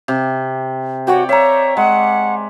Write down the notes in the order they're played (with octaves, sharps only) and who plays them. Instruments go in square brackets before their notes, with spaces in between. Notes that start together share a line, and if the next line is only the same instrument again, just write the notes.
[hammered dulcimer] C3
[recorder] F#4 [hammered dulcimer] C#5 D5 G5
[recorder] C#5 [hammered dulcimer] E5 A#5
[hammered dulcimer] G#3 [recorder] F#5